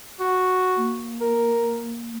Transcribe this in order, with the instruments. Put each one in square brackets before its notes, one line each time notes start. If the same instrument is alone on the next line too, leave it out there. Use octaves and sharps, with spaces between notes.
[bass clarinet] F#4
[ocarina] A#3
[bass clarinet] A#4